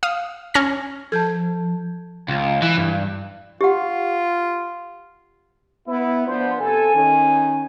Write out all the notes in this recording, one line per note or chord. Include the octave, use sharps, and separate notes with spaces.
F5 D#6
C#4 F6 A#6
F3 A4 A5 G6 G#6
C#2
E3
G2
F4 G4 F#5
B3 E4
F3 B3 D4 C5
C3 A4 G#5
D#3 C#4